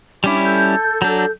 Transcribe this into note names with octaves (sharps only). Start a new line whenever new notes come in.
G3 C#4 D4 E4 D6
A4 G6
F#3 D4